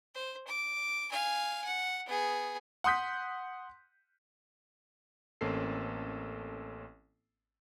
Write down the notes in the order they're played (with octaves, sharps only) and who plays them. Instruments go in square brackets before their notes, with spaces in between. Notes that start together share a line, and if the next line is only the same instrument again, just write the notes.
[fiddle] C5
D6
F5 G#5
F#5
B3 G#4
[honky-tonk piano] F#5 C6 D#6 G6 B6
[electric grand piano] A1 A#3 C4 C#4 A4 C7